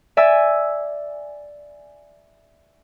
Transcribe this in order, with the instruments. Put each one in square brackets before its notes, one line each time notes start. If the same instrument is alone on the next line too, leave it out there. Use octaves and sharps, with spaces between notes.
[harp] D5 E5 G#5 E6